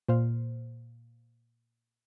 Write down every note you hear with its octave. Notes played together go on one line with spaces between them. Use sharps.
A#2 C5 F5